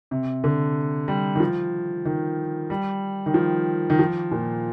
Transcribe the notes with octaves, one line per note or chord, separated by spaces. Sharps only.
C3
D3
G3
D#3
F3
D#3
G3
D#3
F3
D#3
F3
A#2